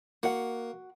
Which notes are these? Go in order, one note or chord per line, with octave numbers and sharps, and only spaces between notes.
A#3 F#4 F#5